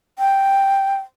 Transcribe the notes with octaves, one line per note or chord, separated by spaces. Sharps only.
G5